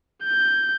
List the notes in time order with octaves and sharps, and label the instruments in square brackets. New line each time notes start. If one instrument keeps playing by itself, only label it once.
[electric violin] G6